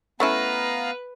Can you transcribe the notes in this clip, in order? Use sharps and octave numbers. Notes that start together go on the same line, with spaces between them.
A3 B3 C#4 E4 B4 F5 A#5